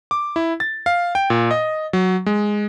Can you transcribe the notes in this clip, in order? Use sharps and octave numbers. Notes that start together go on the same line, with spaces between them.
D6
E4
A6
F5
G5
A#2
D#5
F#3
G#3